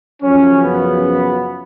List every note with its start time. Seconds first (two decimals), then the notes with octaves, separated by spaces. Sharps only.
0.21 F#2 C#3 F3 C#4
0.61 B3